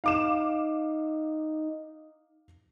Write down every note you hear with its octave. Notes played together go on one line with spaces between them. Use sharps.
D#4 F5 D6 E7